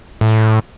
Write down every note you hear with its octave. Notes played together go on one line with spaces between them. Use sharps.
A2